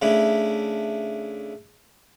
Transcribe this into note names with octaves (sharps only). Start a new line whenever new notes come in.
C#3 A3 D4 E4